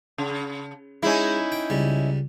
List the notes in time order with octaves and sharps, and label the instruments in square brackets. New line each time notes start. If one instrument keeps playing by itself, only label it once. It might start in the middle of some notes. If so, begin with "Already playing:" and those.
[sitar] C#3
[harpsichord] G#3 [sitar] C#4 D#4 E4
[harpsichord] G5
C#2 G3